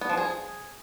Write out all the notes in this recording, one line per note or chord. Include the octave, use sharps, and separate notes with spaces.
B3
F3
G#4